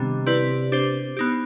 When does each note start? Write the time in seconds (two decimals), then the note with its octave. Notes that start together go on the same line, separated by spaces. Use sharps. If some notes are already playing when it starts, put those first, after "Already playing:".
Already playing: C3 D#3 G3 B3 D4
0.26 C4 E4 G4 B4 D5
0.72 D4 G4 C5
1.17 B3 D#4 G4